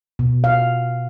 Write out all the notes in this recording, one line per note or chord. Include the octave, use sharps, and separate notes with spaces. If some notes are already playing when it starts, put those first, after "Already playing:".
B2
F5